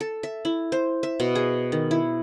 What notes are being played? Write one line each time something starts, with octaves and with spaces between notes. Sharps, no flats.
A4
E5
E4
C5
E5
B2
G#4
D#3
E4